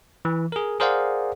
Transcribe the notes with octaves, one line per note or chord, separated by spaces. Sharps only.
E3
G#4 A#4
G#4 A#4 C5 D5 F5 F#5